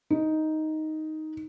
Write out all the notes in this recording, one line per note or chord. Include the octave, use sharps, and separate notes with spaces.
D#4